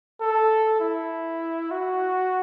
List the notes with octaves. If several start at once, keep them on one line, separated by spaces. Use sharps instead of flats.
A4
E4
F#4